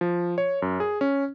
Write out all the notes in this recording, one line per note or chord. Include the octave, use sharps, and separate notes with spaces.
F3
C#5
F#2
G#4
C#4